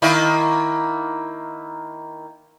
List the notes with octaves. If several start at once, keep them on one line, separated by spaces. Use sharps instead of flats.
D#3 A#3 E4